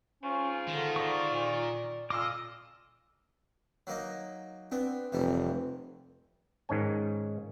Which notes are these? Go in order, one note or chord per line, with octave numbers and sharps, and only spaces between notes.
G#2 C4 C#4 F4
D3 D#3
D5 C#6
A#2
F2 A#2 F4 D#5 F5 D6 E6
F#3 A#3 D#4
B3 C4 D4
F1 E3 G3
G#2 D#3 C#4 G#5